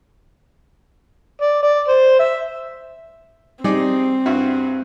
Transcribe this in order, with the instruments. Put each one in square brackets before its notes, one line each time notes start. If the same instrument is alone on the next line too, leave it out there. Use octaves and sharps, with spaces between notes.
[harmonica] D5
D5
C5
E5
[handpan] G3 [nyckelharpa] C4 [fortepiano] D#4 G#4 D5
[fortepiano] G2 E4 F#4